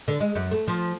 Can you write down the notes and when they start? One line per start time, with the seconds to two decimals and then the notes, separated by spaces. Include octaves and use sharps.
0.08 D3
0.20 G#3
0.35 F#2
0.51 A3
0.68 F3